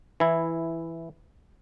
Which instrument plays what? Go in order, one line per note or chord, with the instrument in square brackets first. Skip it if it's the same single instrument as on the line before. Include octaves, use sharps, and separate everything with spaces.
[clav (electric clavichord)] E3 E4